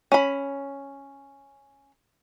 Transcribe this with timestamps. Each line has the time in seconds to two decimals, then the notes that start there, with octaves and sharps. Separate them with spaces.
0.12 C#4 B5